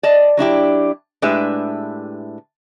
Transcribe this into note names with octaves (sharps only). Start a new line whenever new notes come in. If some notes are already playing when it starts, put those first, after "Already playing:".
D5 D#5 A5
F#3 D4 E4 G4
A2 G#3 D4 G4 B4 E5